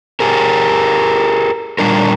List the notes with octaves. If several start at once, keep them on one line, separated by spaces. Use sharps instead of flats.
G4 G#4 A#4
A#2 G3 D4 A#4